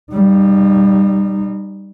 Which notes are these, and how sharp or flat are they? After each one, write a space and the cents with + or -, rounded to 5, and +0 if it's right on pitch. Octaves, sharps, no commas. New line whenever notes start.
G3 +0 D#4 -30